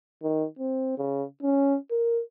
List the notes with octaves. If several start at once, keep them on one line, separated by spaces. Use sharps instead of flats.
D#3
C4
C#3
C#4
A#4